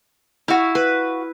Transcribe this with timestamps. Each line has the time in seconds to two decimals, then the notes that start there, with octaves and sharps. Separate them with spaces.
0.48 E4 F#4 F5
0.75 B4